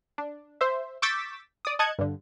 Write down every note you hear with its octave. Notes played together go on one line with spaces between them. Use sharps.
D4
C5 E5
C#6 D6 E6 G6 A6 B6
D5 D#6
D#5 A5 F#6 G#6 C#7
G2 D3